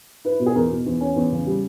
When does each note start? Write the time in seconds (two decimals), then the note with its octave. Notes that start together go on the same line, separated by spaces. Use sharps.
0.25 E4 B4
0.40 B2
0.46 G#4
0.55 E2 A#4
0.71 B2
0.86 E2
1.01 C#4
1.16 E2
1.32 C#3
1.47 G3